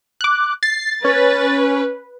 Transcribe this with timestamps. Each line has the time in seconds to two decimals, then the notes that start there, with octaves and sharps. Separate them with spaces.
0.21 D6 F#6
0.63 A6 C7
1.04 C#4 B4